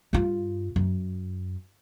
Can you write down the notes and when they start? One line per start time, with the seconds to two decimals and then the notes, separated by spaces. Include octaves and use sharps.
0.13 G2 F4
0.76 F#2